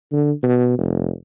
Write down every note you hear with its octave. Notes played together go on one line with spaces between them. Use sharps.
D3
B2
F1